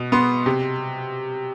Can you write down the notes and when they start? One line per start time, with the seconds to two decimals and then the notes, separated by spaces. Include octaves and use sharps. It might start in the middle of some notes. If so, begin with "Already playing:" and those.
Already playing: B2
0.12 B3 C6
0.46 C3